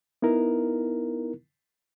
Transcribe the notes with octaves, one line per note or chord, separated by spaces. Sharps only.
B3 D#4 E4 A#4